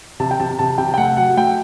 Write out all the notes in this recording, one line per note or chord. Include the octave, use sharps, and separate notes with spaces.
C3 A5
G5
C3 A5
C3 A5
C3 G5
G5
A3 F#5
F#3 F#5
A3 G5